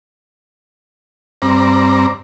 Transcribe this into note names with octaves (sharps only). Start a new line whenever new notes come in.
G2 C4 D5 A#5